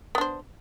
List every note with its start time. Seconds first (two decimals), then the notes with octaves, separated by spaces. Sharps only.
0.15 B3
0.18 D4
0.21 C5